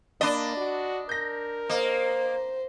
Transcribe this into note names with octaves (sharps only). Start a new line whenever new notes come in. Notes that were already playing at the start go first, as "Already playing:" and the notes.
A#3 D4 D5 D#5 B5
F#4
A#4 G6 A#6
A#3 C5 D#5